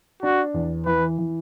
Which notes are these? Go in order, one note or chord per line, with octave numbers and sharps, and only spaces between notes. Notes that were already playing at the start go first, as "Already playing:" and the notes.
D4 F#4
E2
E3 B4
E3